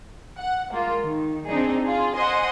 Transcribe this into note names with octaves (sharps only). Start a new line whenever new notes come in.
F#5
G#3 A#3 F4
D#3
C4 D4 D#4 G#4
F4 G#4
C5 D#5 F#5 G#5 C6 D#6